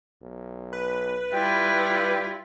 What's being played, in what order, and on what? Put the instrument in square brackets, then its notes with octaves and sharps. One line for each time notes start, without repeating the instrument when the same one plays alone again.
[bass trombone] B1
[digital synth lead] B4
[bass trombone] G3 [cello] E4 F4 [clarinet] G5